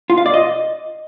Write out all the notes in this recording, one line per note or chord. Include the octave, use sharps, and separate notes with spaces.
F4
F5
D5
D#5